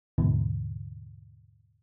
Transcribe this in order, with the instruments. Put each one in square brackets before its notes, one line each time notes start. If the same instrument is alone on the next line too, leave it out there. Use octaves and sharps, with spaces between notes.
[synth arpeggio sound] D#2 G#2 B2 D3 E3